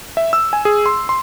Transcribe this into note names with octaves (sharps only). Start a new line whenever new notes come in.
E5
E6
G#5
G#4
C6
C6